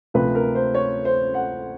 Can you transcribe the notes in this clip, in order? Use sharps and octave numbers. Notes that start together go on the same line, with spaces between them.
D2 C3 F3 B4
A#4
C5
C#5
C5
F#5